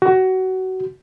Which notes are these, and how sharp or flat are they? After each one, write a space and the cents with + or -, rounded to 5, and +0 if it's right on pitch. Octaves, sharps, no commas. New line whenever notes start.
F#4 +25